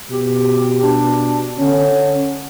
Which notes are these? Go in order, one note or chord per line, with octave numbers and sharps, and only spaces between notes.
B2 G4
D4
D3 C#4